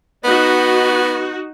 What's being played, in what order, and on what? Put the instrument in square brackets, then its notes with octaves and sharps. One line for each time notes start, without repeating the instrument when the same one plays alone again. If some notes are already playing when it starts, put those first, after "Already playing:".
[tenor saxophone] B3 [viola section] D#4 F#4